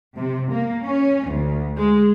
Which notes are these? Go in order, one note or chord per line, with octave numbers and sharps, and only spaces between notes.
C3
A#3
C#4
D2
G#3